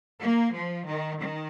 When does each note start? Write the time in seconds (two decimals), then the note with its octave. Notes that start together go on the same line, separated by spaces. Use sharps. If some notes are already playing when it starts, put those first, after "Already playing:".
0.21 A#3
0.53 F3
0.86 D#3
1.18 D#3